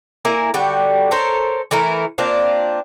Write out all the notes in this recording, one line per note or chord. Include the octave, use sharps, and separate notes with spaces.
A#3 E4 A#4 G#5
D3 G3 F#4 G5
A4 A#4 C5 C#5
E3 A3 E4 A#4
A#3 C4 D4 F4